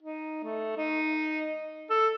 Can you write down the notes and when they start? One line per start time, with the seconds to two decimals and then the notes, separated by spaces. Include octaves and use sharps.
0.03 D#4
0.44 A3
0.77 D#4
1.90 A4